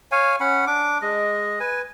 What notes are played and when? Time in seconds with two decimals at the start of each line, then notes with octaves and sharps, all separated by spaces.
0.12 C#5 F5 G#5
0.40 C#4 F#5 B5
0.67 D4 D6
1.02 G#3 D#5
1.60 B4 G#5